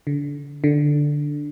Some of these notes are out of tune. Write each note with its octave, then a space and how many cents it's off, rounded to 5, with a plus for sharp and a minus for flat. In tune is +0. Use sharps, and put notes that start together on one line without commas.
D3 -30
D3 +0